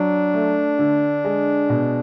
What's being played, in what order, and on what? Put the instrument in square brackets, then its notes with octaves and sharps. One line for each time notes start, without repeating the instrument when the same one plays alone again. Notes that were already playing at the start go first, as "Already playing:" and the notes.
Already playing: [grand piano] F#3 [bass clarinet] D4
[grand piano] A3
D3
G#3
B2